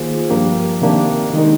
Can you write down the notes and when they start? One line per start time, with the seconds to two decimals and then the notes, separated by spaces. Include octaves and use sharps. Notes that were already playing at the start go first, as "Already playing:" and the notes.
Already playing: D#3 A#3 F4 G#4 C5
0.29 G2 F3 A#3 D4 G4
0.82 C3 D#3 A#3 D4 G4
1.34 D#3 G#3 D#4 A#4